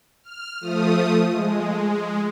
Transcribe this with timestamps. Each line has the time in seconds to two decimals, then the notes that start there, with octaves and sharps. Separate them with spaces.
0.23 F6
0.61 F3 A3 D#6
1.33 G#3